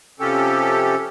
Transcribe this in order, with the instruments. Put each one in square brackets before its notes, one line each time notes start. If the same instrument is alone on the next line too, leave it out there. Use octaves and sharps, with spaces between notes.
[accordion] C3 F3 C#4 G4 A4